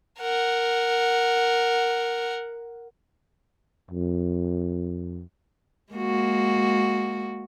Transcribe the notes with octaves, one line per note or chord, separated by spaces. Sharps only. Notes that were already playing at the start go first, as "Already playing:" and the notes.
A#4 F#5
F2
G#3 A#3 F#4